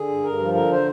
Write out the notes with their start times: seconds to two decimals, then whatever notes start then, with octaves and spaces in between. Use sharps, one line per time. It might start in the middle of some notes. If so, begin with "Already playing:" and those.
Already playing: D3 G#4
0.08 G2
0.23 G2 A#4
0.40 F3
0.54 D3 A#4
0.71 C5